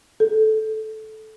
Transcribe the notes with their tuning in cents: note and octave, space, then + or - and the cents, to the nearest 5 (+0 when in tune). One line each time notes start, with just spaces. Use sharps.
A4 -10